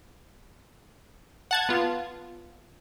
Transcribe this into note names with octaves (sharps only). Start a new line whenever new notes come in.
F#5 A5 G#6
B3 F4